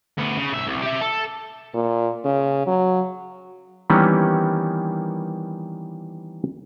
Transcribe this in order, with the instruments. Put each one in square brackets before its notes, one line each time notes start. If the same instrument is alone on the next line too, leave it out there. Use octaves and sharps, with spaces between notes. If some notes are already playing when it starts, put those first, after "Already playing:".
[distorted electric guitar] D2 B3
C#3
B1 E5
C2
G4 E5
A4
[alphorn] A#2
C#3
F#3
[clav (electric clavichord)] D#3 E3 G3 A#3 B3 C#4